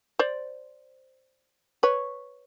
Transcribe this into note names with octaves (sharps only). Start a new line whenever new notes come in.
C5 D5
B4 C#5